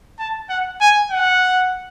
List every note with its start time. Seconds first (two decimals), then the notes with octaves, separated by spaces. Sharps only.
0.19 A5
0.49 F#5
0.81 G#5
1.11 F#5